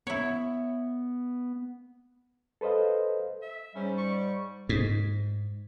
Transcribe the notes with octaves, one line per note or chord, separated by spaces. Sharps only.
B3 E4 C#5
A4 B4 C5 D#5 F5
E5
G#2 G3 C#4
C#6
G#2